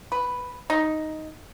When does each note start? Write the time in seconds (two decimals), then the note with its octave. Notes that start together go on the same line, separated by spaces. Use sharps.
0.12 B4
0.70 D#4